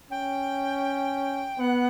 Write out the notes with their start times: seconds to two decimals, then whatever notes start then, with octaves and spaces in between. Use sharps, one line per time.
0.11 C#4 G5
1.60 B3 F#5